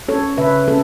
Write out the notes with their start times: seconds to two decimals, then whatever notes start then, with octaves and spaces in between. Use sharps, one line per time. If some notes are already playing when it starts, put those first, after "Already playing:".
0.08 C#4 A4 C#5
0.37 C#3 B4 E5
0.68 C#4 A4